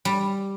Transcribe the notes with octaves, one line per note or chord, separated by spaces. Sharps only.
G3